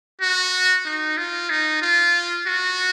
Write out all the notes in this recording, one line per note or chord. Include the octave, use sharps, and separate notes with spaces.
F#4
D#4
F4
D#4
F4
F#4